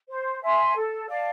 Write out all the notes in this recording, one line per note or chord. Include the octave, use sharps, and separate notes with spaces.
C5
E5 G#5 C6
A4
D5 F5 A5